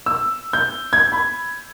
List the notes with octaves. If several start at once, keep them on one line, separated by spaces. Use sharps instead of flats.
E6
G6
G#6
B5